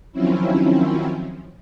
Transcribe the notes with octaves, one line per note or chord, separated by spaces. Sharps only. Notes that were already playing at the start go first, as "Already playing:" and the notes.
D#3 F3 F#3 C4 C#4 E4